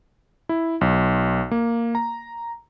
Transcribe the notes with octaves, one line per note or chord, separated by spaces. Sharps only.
E4
B1
A#3
A#5